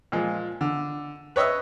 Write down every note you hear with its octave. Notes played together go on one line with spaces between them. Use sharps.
A#2 F3 G#3
D3
B4 C#5 D#5 E5 E6